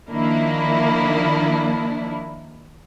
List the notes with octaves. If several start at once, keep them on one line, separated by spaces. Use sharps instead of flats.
D#3 F3 A#3 D4 E4